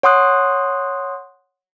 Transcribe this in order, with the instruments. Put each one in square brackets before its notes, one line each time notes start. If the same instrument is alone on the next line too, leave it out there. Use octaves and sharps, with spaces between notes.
[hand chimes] C#5 F#5 C6 D#6 F#6